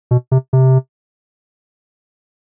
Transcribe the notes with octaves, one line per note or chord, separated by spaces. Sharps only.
B2
C3
C3